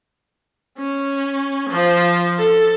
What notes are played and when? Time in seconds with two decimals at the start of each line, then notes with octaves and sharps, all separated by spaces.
0.78 C#4
1.70 F3
2.38 A4